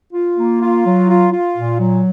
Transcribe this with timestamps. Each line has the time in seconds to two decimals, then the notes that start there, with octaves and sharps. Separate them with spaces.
0.13 F4
0.38 A#3
0.62 F4
0.85 F#3
1.09 F4
1.33 F4
1.56 A#2
1.80 F#3